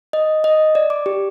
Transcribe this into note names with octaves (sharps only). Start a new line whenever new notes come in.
D#5
D#5
D5
D6
G4